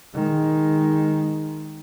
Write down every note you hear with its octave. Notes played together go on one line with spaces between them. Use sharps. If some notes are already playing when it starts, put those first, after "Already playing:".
D#3 G#3